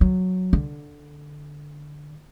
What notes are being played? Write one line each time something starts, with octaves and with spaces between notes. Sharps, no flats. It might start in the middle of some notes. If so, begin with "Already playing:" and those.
F#3
D3